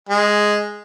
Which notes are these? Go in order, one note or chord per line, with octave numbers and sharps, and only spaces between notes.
G#3